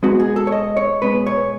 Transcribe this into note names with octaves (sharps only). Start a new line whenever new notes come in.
B2 G#3 B3 F#4
G#4
A4
C#5
D#5
C#5
B2 G#3 B3 B4
C#5